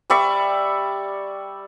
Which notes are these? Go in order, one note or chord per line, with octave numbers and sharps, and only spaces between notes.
G3 D5 E5 C#6